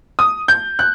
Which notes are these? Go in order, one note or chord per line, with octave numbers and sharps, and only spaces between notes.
D#6
G6
F#6